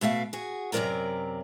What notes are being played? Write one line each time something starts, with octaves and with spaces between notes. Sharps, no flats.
B2 A3 E5 F5
F#4 G#4
F#2 C3 F#3 A#4 D5 A#5